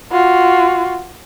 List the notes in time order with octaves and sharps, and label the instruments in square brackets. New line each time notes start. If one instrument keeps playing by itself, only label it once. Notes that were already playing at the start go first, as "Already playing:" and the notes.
[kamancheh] F4 F#4